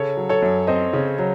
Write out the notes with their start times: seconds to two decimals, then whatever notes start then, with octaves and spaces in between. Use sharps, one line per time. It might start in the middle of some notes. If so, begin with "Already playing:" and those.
Already playing: C#3 A4 C#5
0.17 F#3
0.29 A4 C#5
0.42 F#2
0.67 C4 C5 D#5
0.93 C#3
1.19 F#3